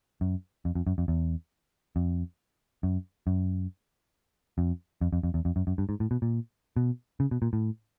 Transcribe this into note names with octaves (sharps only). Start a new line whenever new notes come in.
F#2
F2
F2
F#2
F2
E2
F2
F#2
F#2
F2
F2
F2
F2
E2
F2
F#2
F#2
G2
G#2
A2
B2
A#2
B2
C#3
B2
A#2
A2